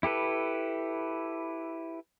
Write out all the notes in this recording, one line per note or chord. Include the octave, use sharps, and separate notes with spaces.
E4 G4 A4 B4